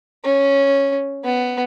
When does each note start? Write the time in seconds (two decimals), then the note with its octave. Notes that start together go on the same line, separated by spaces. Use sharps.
0.24 C#4
1.25 B3